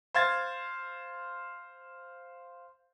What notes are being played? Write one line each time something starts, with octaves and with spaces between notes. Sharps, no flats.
C5 F5 G#6 A6